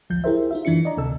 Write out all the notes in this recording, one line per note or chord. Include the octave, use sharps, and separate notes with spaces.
A1 D2 F3 G6
E4 G4 G#4 A#4 C5 E5
D#4 F4 E5
F#2 E3 D4 E4 C#7
D5 D#5 A#5
D2 C3 A4 A5 E6